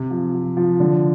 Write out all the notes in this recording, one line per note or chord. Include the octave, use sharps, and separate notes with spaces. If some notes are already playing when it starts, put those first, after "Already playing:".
Already playing: C3
F3
F3
F3
D3